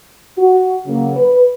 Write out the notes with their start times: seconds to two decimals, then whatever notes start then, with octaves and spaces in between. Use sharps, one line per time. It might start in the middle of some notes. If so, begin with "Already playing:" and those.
0.38 F#4
0.85 C#3 F#3 A#3
1.16 B4